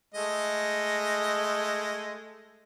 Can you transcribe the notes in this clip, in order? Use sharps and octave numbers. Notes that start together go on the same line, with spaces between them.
G#3 A3 D#5